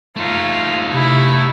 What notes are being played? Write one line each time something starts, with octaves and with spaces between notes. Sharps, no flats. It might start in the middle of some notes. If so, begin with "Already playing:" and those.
A3 D#4 F4
C3 E4